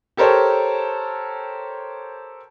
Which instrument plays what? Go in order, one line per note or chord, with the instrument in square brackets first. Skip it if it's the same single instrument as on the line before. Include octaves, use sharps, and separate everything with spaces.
[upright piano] G4 A4 A#4 C5 C#5